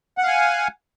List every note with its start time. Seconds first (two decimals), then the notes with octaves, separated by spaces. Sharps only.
0.18 F#5
0.23 F5
0.28 G#5